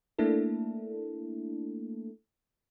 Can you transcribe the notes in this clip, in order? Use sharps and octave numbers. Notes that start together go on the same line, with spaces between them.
A3 A#3 D4 E4 A4